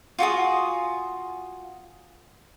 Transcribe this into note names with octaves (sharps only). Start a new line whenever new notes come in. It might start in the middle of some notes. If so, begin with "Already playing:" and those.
F4 F#4 G#4 D#6